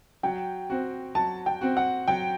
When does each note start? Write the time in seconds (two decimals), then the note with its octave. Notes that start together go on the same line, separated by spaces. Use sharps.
0.23 F#3 G5
0.70 C4 F#4
1.15 F#3 A5
1.46 G5
1.61 C4 F#4
1.77 F#5
2.08 F#3 G5